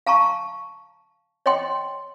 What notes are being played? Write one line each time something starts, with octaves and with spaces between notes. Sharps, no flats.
F5 A5 A#5 C#6
C#5 D#5 F#5 G5 C6